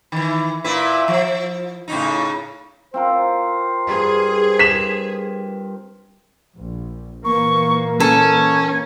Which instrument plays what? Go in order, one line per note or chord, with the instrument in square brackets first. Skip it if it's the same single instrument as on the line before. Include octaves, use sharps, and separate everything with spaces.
[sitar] D#3 E3
A#2 E4 B4
F3
A2 C#3 D#4
[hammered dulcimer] C4 F4 A#4 [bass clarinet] C5
[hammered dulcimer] G2 [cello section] G#4
[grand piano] B6 E7
[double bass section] A#1
[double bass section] A#2 E3 A#3 [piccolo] C#6
[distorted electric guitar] C#4 [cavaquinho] A4 [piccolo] G#6